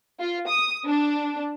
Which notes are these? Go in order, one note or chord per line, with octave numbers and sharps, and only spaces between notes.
F4
D#6
D4